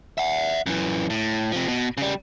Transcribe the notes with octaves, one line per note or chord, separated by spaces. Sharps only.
E5 F#5
F#2 E3
A2
C3 F3
B2
C#3 G3